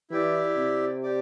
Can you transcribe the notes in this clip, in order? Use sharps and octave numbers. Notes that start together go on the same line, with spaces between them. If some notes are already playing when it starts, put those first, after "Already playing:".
E3 E4 G4 D5
C3
G4 D5